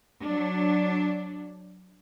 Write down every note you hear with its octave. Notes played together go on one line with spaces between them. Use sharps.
F#3 D4